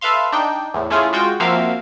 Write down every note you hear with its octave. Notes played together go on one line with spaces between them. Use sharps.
A4 B4 E5 F5 C6
D4 D#4 G5
E2 A2
A3 C#4 E4 F4 G#4
G#3 F4 F#4 G5
F3 A#3 C4 F#4 E5 F5